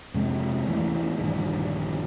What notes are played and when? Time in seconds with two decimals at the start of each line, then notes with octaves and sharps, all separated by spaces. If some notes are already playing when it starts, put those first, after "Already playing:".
0.14 F2 C3 G#3 C4
0.67 G#1 E2 E3 A3
1.18 A#1 G2 D3 D#3